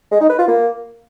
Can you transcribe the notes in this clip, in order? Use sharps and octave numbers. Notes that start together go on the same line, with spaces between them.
G#3
D#4
B4
F4
A#3